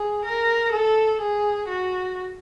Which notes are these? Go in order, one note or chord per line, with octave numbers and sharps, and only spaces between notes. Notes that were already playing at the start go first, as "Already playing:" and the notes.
Already playing: G#4
A#4
A4
G#4
F#4